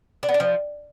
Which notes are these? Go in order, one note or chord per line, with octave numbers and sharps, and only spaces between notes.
D4
B3
D4
F3